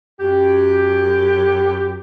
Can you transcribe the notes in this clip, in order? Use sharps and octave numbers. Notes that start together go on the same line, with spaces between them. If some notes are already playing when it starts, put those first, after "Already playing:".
F#2 G4